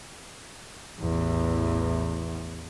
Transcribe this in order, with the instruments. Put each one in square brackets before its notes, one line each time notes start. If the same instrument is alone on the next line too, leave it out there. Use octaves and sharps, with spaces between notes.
[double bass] A1 E2